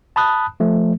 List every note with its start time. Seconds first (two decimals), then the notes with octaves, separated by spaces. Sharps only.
0.16 A5 B5 D#6 F#6
0.60 F3 A3